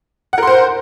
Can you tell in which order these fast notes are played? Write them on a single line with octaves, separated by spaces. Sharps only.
F#5 A#4 C6 C5